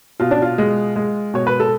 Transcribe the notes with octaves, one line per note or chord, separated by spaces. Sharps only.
B2 F4
D4
F4
G#3
G#3
B2 C#5
B4
A4